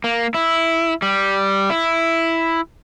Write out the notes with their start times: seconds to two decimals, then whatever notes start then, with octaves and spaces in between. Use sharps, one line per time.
0.04 A#3
0.34 E4
1.02 G3
1.70 E4